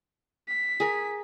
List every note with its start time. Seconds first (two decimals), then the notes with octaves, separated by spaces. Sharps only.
0.48 B6
0.80 G#4 A#4